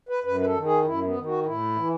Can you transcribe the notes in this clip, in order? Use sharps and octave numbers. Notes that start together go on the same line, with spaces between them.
B4
F#2 B4
B4
A4
D#3
G#4
F#2 E4
B3
D#3
F#4
A2 E4
E3